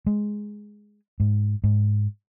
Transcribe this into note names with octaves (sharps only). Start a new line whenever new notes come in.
G#3
G#2
G#2